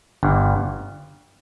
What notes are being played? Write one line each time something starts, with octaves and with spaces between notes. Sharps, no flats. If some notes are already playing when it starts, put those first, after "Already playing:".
G1 G2